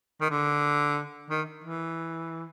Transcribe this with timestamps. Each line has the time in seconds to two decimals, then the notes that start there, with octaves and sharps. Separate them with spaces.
0.21 D#3
0.30 D3
1.30 D#3
1.64 E3